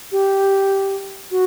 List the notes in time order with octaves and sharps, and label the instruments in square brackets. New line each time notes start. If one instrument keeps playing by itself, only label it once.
[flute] G4
F#4